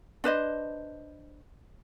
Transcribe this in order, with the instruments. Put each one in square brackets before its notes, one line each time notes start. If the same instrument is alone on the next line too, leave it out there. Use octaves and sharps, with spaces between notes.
[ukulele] D4 B4 C5 D#5